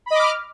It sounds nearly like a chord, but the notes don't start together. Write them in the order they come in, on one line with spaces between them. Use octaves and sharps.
B5 D#5 D6 F6